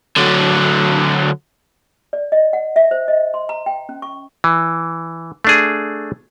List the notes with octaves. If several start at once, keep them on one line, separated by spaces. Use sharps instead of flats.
D3 F#3
D5
D#5
F#5
E5
C5
D#5
C6
A#5
G5
C#4
C#6
E3
A3 D4 G#4